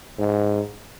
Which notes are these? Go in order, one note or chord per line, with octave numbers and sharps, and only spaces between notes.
G#2